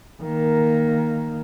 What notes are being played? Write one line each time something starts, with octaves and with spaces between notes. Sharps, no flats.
D#3 A#3